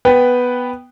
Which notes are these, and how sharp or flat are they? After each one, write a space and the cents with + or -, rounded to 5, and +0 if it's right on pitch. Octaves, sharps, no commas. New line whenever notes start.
B3 +0 B4 +0 G5 +0